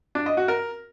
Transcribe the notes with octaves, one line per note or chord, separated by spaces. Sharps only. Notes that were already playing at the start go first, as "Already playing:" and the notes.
D4
D#5
F#4
A#4